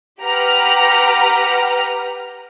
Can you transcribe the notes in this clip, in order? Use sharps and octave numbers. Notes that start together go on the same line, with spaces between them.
G4 B4 F#5 A#5 F6